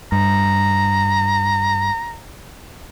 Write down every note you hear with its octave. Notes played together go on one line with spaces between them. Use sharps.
G2 A#5